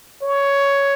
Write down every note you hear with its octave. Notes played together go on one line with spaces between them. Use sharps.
C#5